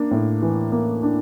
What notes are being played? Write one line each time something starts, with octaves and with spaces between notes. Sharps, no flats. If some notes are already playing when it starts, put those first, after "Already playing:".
Already playing: A#3 D4
A2
E3
A#3
D4